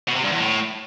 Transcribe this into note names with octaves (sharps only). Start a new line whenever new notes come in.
B2
C3
G2
E2
A2